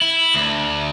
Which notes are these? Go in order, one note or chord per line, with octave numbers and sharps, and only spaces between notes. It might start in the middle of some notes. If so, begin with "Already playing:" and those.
E4
D2